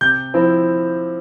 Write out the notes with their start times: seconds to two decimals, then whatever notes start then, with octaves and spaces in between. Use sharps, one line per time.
0.01 C3 G6
0.34 F3 C4 E4